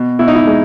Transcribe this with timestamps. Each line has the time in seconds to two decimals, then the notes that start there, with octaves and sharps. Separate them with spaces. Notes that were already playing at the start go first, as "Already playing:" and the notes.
Already playing: B2
0.19 B2 E4
0.28 D#4
0.35 E4
0.47 G#3